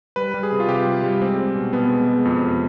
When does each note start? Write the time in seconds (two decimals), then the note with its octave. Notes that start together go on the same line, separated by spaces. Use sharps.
0.16 G3 B4
0.34 G3
0.43 G#4
0.52 C3
0.60 F4
0.68 C3 G4
0.86 G3
1.03 G3
1.22 G#3 C4
1.38 G#3
1.55 B2
1.73 B2 B3
1.91 G#3
2.08 G#3
2.25 F2
2.42 C3